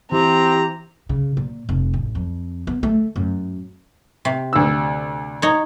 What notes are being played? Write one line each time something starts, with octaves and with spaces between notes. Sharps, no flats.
E3 C4 G4 A#5
C#3
A#2
F1
A1
F2
B3
A3
F#2
C3
D2 E6
D#4 C#5